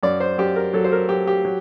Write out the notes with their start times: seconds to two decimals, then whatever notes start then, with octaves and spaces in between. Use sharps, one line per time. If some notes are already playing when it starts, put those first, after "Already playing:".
0.03 F#2 D5
0.20 C5
0.38 F#2 G4
0.56 A#4
0.73 F#3 A4
0.84 C5
0.92 A#4
1.09 F#3 G4
1.27 G4
1.45 F#3